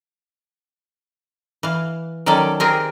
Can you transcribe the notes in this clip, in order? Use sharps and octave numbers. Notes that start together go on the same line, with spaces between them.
E3 F5
D#3 F#3 C#4 A4 D5
C4 G4 G#4 A#4